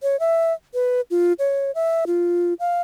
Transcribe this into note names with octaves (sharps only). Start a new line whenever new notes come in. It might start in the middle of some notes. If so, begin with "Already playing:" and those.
C#5
E5
B4
F4
C#5
E5
F4
F5